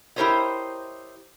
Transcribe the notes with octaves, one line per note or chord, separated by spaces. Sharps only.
E4 G4 A#4 C5 C#5 D#5